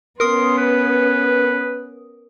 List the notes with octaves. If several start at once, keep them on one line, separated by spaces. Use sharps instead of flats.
B3 C#4 A#4 C6 D#6
B4